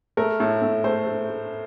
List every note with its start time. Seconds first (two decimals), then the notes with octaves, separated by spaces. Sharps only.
0.17 A3 A#4
0.40 A2
0.62 A2
0.84 A3 C5
1.07 A3
1.29 A3